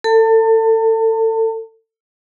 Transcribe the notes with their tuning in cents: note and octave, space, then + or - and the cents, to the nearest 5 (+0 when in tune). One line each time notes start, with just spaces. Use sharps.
A4 +25 A5 +35